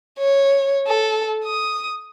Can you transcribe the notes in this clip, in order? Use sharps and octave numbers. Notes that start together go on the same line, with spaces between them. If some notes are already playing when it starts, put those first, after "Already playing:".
C#5
A4
D#6